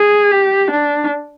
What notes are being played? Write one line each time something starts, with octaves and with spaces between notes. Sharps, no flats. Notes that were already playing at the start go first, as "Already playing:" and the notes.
Already playing: G#4
G4
D4